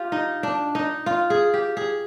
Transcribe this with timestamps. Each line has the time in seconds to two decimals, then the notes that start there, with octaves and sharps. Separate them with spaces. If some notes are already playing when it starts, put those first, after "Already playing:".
Already playing: F4 G4
0.12 D#4
0.43 D4
0.75 D#4
1.06 F4
1.30 G#4
1.54 G4
1.77 G#4